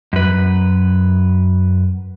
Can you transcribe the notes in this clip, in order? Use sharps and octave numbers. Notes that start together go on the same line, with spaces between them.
F#2 B4